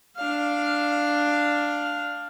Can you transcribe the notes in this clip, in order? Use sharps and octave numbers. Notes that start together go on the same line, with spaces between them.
D4 F5